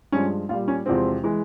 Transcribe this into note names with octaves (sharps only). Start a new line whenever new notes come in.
G2 F3 G#3 C#4
A#2 G3 F4
C#4
E2 C3 F3 G#3 C4
E3 G#3